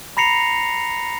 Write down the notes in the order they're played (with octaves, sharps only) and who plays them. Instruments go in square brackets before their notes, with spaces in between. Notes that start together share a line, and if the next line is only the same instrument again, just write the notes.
[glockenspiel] A#5 B5 A#6 C7 C#7 F7